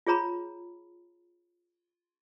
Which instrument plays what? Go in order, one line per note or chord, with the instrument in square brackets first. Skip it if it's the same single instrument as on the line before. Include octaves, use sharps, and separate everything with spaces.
[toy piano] F4 G#4 C#5 A#5 B5